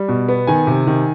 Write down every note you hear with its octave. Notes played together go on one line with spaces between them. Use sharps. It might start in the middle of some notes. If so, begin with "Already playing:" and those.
Already playing: G3
B2
B3
D#3 G#5
C3
D#3